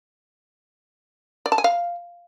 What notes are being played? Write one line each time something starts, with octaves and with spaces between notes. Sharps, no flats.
D5
A5
G#5
F5